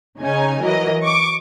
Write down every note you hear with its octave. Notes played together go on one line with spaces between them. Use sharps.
C#3 C#4 D#4 G#5
E3 F#3 A#4 D#5
C#6 D6